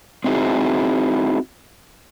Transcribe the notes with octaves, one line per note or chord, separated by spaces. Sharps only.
C4 D#4 E4 F#4 G#4